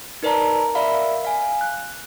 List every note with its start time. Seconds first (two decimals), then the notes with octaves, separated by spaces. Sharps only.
0.23 D#4 A#4 B4 D5 A5 A#5
0.75 A#4 D5 E5 F5 B5
1.25 F5 G#5
1.61 F#6